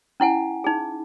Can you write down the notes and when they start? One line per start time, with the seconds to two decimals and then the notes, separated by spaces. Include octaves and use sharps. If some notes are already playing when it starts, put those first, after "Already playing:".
0.20 C#4 E4 F#5 G#5
0.64 D#4 G#4